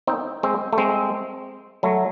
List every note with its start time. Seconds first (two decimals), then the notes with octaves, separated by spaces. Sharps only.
0.07 C4 D#4
0.43 G#3 C4
0.73 A3
0.78 G#3 C4
1.83 F#3 A3